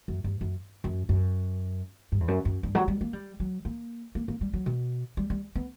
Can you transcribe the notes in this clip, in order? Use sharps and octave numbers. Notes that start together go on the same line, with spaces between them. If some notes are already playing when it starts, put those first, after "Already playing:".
F#2
G2
F#2
F#2
F#2
G2
E2
F#2
F#2
G2
F#3
G3
A#3
G3
F#3
A#3
A#3
A#3
G3
F#3
B2
G3
G3
B3